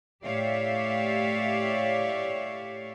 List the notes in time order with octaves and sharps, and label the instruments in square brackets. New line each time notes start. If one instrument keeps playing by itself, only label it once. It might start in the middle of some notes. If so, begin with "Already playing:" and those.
[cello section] A2 G4 C#5 D5 E5 F5